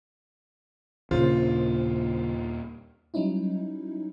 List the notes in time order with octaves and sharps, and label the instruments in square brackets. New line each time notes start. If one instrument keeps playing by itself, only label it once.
[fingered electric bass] D#2 A#2 D4 [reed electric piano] C#3 C5 [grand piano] F4
[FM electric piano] F#3 G3 C#4 D#4 E4